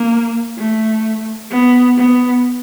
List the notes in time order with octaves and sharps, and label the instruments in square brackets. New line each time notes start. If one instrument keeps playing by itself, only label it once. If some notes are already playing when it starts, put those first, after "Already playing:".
Already playing: [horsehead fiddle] A#3
A3
B3
B3